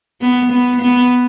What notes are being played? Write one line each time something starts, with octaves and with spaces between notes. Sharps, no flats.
B3
B3
B3